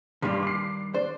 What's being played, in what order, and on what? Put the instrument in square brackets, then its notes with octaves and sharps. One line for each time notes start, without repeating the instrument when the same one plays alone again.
[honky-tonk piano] G2 C6 [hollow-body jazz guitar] D#3 G3
[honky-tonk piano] D6 C7
[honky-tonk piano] D4 [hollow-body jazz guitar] C5